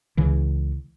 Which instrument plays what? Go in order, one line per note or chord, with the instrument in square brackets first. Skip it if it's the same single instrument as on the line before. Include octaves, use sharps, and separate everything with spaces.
[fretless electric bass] C#2 C#3 E3